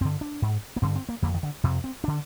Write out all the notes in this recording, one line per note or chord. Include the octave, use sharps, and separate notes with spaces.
G2 D3 C4
D4
G#2
A#3
G2 D3 C4
C4
A#3
F2 D3 A#3
D#3
D3
F2 C3
C4
D3 D4